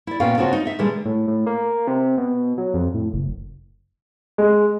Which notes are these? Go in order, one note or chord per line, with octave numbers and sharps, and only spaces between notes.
E4 D5
A#2 B3 C#4 F#4 F5 G5
C#3 C4 D4 F4 F#4
D#4
D#4 E5
A#2 D3 E3 G3 G#3
A2
A2
A#3
C3
B2
F#3
F2
A2
F#1
G#3